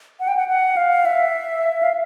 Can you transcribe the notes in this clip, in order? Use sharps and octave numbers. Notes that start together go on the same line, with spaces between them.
F#5
G5
F#5
F#5
F5
E5
F5